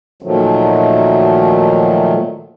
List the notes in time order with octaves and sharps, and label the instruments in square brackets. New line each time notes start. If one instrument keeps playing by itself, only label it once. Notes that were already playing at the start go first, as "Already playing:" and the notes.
[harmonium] A#2 D#3 F3 F#3 A3